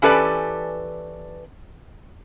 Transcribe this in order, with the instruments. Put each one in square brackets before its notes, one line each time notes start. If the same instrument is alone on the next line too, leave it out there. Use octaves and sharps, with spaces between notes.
[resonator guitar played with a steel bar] E3 C#4 G4 A4 B4 D5